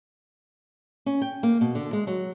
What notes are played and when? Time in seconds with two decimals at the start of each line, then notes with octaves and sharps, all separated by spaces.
1.06 C#4
1.22 G5
1.43 A#3
1.61 B2
1.75 D3
1.93 G#3
2.07 F#3